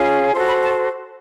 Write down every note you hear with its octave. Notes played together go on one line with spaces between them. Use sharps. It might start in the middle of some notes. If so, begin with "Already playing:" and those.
Already playing: C#4 F4 G#4
F#4 A4 C5 C6
B5
A5